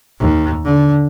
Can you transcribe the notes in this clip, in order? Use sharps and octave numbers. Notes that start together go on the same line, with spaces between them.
D#2
D3